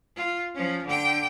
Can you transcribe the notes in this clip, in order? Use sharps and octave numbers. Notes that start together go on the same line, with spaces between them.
F4
F3 C#4
D3 G5